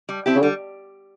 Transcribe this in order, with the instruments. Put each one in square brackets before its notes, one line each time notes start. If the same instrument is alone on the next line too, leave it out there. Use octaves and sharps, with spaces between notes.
[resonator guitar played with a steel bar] G3
C4 E4 G4
[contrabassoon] C#3
[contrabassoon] D3 [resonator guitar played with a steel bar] G3